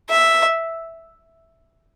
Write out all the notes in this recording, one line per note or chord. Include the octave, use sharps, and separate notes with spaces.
E5